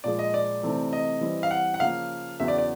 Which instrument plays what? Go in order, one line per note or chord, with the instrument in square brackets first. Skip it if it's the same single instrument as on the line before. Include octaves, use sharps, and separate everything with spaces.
[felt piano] A#2 F3 G#3 [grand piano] D5
[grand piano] D#5
D5
[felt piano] C3 E3 A3 C4 D#4
[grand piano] D#5
[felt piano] E3 G3 C4
[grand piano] F5
F#5
F#5
[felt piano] C#3 F3 A#3 [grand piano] F5
[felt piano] E2 C#3 F#3 [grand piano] E5
[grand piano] D5
D5